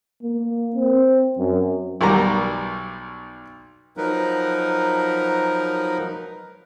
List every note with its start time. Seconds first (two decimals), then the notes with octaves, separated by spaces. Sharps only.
0.23 A#3
0.75 C4
1.38 F#2
2.01 B1 G3 A#5
3.97 F3 F#3 D#4 A#4 B4